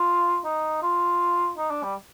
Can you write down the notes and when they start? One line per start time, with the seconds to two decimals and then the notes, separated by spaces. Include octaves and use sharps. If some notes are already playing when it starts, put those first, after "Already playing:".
Already playing: F4
0.45 D#4
0.83 F4
1.58 D#4
1.71 D4
1.83 G3